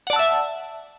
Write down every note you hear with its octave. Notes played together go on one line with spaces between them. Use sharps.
D5 E5 F#5 A5 E6